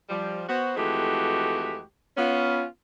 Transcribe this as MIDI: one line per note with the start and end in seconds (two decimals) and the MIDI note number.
0.09 0.44 53
0.09 0.44 55
0.49 0.75 59
0.49 0.75 66
0.49 0.75 72
0.76 1.81 41
0.76 1.81 52
0.76 1.81 56
0.76 1.81 57
0.76 1.81 66
0.76 1.81 67
2.17 2.65 59
2.17 2.65 61
2.17 2.65 65